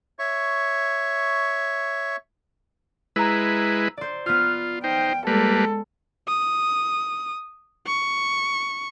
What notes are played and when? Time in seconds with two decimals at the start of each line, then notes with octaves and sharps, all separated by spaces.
0.19 C#5 E5 C#6
3.16 G#3 E4 B4 A#5 E6
3.97 C5 D5
4.26 B3 F4 F6
4.84 D#4 C5 G5
5.27 G3 G#3 A#3 A4 B4
6.28 D#6
7.87 C#6